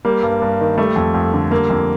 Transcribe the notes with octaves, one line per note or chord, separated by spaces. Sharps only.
G3 A#3
G2
G2
D#3
G3 A3
F2
F2
D3
G3 A#3
F2